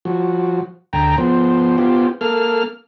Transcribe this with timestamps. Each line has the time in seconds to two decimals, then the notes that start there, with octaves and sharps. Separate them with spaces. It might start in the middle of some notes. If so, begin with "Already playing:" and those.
0.05 F3 F#4
0.93 D2 G5 A#5
1.18 F3 B3 C5
1.78 B3 F4 G4 C5
2.21 A#3 A4 F6